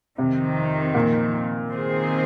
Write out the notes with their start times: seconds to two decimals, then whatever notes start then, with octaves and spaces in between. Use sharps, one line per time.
0.18 F2 C3 D#3 C4
0.95 A#2
1.71 D#3 C4 G#4 C5